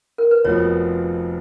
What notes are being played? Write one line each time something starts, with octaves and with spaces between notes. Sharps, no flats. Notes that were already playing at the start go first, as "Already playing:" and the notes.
A#4
B4
F1 F2 F3 B3 F#4 C#5